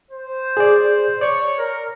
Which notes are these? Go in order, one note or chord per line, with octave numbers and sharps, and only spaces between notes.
C5
G#4 D5
C#5 D5
A#4